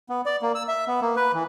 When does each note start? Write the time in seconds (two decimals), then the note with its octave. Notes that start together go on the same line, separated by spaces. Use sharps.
0.09 B3
0.26 D5
0.42 A#3
0.55 E6
0.68 E5
0.87 B3
1.02 A#3
1.17 B4
1.34 E3